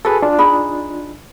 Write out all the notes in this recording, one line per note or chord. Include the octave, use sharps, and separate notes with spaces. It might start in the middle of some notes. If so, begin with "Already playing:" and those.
F#4 G#4 A4 B4
D4 F4
D#4 G#4 B5